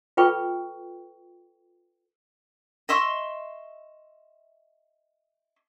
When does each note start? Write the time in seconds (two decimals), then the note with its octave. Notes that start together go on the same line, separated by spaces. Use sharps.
0.17 F4 A4 B4 G5 C#6
2.89 D#5 E5 C6 C#6